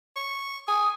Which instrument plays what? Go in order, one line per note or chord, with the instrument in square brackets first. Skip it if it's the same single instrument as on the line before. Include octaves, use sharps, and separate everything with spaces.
[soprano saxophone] C#6
[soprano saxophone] G#5 [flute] D#6